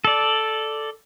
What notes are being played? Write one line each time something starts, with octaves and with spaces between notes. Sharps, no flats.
A4 D5